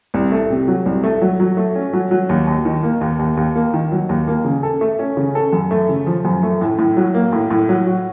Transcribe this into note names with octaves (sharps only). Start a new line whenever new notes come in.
C2
A3
C3
F#3
C2
A3
F#3
F#3
A3
C#4
F#3
F#3
D#2
D#2
D#3
A#3
D#2
D#2
D#2
A#3
D#3
F#3
D#2
A#3
C#3
A4
A3
C#4
C#3
A4
F#2
A3
C#3
F3
F#2
A3
A2
A2
F#3
A#3
A2
A2
F#3
F#4